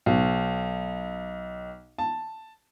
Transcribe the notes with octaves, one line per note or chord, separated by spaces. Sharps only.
B1
A5